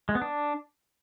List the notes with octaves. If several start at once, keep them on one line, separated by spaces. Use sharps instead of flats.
G#3
B3
D4